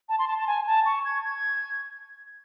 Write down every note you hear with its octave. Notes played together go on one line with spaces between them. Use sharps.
A5
C6
A5
A5
G#5
A5
C#6
G#6
G#6